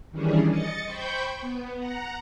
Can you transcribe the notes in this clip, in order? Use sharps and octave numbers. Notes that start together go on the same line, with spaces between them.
D#3 E3 G3 C#4 D4 G#4
D#5 A6 C#7
C5 G5 B5 C#6 G6
B3
F#5 A#5